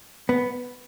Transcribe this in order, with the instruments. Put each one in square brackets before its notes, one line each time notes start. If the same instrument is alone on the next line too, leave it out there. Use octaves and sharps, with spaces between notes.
[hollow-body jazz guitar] B3